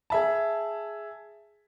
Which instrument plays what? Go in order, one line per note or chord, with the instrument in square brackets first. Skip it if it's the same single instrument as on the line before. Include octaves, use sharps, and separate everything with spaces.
[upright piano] G#4 E5 A5